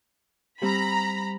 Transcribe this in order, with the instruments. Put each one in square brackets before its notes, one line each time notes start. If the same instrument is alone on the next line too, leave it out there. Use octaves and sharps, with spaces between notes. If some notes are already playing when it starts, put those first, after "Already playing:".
[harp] G3 C4 [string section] A#5 B5